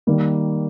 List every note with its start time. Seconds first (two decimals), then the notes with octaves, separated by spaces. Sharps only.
0.07 D#3 G3 A#3